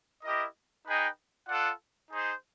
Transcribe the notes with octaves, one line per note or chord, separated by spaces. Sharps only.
E4 G4 A#4 D#5
D#4 G#4 B4 D#5 G5
F4 A4 D5 F#5
D#4 G#4 C5